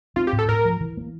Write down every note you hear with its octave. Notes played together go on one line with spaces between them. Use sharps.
C4 F4
G4
A2
A4
A2 A#4
F3
E3
A#3